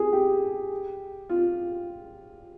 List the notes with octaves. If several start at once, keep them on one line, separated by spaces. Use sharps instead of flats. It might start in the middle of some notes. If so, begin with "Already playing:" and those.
Already playing: G#4
G4
F4